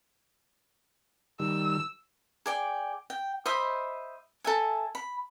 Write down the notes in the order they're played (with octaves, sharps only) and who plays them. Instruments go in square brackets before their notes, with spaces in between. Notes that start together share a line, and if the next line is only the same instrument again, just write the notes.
[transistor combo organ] D#3 G3 [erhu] E6
[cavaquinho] G#4 D5 G5
G5
C5 D#5 E5 B5
A4 E5 G#5
B5